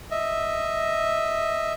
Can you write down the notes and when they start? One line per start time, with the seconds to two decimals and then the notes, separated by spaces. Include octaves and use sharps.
0.11 D#5 E5